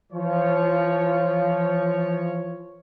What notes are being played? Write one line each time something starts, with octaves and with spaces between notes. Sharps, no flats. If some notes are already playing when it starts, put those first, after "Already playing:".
E3 F3 C#5